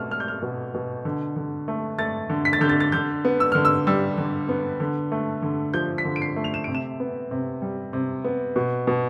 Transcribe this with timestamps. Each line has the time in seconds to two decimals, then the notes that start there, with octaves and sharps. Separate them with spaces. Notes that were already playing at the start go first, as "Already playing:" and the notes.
Already playing: B2 A3 F6
0.11 A3 F6
0.20 G6
0.28 F6
0.42 B2
0.74 B2
1.05 D3
1.36 D3
1.68 A3
1.99 A3 A6
2.30 D3
2.45 B6
2.53 A6
2.61 D3 G6
2.69 A6
2.80 A6
2.92 D3 G6
3.25 B3
3.40 E6
3.52 D3 F6
3.65 E6
3.87 G3 E6
4.18 D3
4.49 B3
4.80 D3
5.12 A3
5.42 D3
5.74 F3 G6
5.98 B6
6.05 D3
6.16 D7
6.22 C7
6.36 A3
6.44 F7
6.54 E7
6.64 C3 D7
6.75 E7
7.00 B3
7.31 C3
7.62 G3
7.93 C3
8.24 B3
8.56 B2
8.87 B2